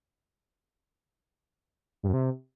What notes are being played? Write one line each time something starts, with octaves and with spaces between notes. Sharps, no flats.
G2
F#2
C3